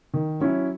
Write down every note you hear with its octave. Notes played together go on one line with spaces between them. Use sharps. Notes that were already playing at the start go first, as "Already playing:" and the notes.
D#3
F#3 C#4 E4